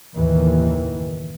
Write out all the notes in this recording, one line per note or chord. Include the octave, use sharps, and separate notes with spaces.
F#1 D#2 A2 D#3 E3